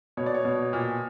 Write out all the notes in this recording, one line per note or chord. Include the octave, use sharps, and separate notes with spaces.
B2 C#5
D5
C#5
B2
A#2